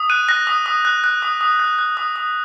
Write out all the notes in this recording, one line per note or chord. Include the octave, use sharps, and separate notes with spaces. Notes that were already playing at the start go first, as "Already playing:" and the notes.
Already playing: D#6
F#6 D#7
F#6 A#6
D#6
D#6
F#6
F#6
D#6
D#6
F#6
F#6
D#6
D#6